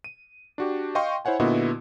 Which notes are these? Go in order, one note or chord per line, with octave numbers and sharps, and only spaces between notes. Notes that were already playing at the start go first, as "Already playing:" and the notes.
D#7
D4 F#4 G4
D#5 F5 G5 C6 C#6
E4 C5 C#5 F#5 G#5
A#2 D3 B3 E4 F#4 D#5